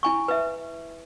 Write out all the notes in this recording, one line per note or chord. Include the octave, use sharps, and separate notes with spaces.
E4 G#5 C#6
B4 E5